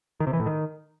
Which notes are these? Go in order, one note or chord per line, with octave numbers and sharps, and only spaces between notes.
D#3
C3
E3
A2
D#3